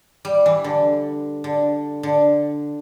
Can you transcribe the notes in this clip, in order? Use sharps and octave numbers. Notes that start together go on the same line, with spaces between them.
G3
E3
D3
D3
D3